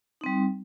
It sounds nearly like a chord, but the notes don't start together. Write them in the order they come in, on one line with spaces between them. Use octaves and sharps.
D#4 C4 G3